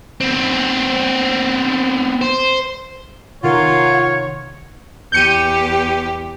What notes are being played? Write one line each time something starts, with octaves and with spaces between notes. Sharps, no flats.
B3 C4
C5
C3 D#3 F4 A#4 C#5 F#5
E2 G4 G6 C#7 D#7